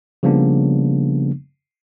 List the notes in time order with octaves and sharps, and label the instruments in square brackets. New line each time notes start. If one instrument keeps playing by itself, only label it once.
[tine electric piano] C#3 F3 G3 A#3 B3 D4